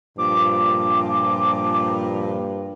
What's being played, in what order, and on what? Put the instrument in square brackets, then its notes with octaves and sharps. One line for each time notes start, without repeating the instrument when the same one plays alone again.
[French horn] G2 [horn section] A#2 F3 [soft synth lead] D6